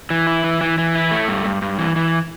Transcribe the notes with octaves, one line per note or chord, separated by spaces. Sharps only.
E3
E4
E3
E3
E3
E4
A3
G2
G2
G2
E3
E3